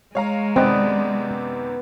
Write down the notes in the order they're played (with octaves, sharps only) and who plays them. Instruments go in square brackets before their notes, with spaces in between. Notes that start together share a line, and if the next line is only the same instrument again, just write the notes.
[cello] G#3 [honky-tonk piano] C#5 F5 A#5
[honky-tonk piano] F#2 C3 D#3 [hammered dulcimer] B3 D5 [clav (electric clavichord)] C4 D#5